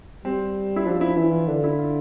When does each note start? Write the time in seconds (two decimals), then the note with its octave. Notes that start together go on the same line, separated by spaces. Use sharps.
0.25 G3 C4
0.76 E4
0.86 F3 D4
1.01 E4
1.17 E3 E4
1.32 F4
1.48 D3 D4
1.57 F4
1.64 E4
1.79 F4